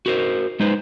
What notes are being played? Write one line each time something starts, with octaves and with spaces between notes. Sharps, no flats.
F#4 A#4 C5
G#3 D#4 B4 C5